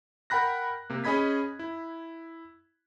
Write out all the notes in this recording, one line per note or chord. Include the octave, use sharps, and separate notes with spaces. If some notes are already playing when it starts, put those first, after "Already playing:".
A#4 F#5 G5 B5 F#6 A#6
C3 A#3
C#4 G#4 D#5 B5 G#6 B6
E4